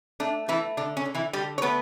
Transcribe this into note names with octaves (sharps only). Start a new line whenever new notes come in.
A3 D4
E3 A3 E4
D3 D4
C#4
D3
E3 E4
D3 G3 G4
C#5
A3 B3 B4